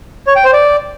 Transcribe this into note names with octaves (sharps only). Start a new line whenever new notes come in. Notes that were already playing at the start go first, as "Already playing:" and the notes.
C#5
G5
C5
D5